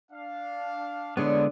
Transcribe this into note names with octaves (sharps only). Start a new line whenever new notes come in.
D4 F5
D3 G#3 B3 D4 E4 C#5